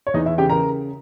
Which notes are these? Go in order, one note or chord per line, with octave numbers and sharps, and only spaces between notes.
C#5
E2 D#4 D#5
E4 E5
C#3 G4 G5
A#4 A#5